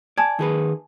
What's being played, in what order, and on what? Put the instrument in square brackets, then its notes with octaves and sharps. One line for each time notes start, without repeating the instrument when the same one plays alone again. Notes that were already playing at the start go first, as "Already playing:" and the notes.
[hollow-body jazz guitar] D5 [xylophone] G#5 A5 G#6
[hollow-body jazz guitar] D#3 G#4 B4